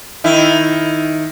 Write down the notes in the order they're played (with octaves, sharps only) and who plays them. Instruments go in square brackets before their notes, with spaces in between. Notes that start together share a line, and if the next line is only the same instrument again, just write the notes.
[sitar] D#3 E4